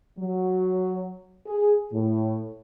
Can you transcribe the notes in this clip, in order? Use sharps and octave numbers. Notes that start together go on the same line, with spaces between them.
F#3
G#4
A2